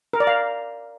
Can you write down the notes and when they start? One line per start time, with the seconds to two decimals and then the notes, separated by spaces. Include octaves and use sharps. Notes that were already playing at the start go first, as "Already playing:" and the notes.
0.13 A#4
0.20 D5
0.27 F5